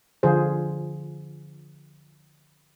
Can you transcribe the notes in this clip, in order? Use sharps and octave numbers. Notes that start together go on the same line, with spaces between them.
D3 F3 F4 G#4 C5